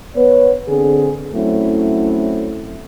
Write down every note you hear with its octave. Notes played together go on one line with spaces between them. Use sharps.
B3 B4 C#5
D3 C4 G#4
F#3 A3 C4 C#4 E4